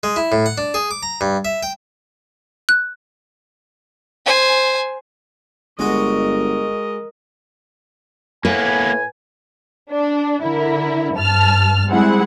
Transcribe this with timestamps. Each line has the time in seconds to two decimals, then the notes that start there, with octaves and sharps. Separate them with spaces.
0.03 G#3
0.16 E4
0.32 A2
0.46 F#5
0.58 D4
0.74 G#4
0.91 D6
1.03 A#5
1.21 G2
1.45 E5
1.63 G5
2.69 F#6
4.26 C5 G#5
5.79 G1 G#3 F#4 A#4 D#5
8.45 A2 A#3 B3 B4 G#5
9.91 D4
10.42 D3 E4 A#4
11.15 G2 A5 F6
11.88 G3 G#3 C4 E4 G#4 F#5